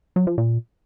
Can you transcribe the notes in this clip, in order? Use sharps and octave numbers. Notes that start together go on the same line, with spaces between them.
F#3
F3
A#2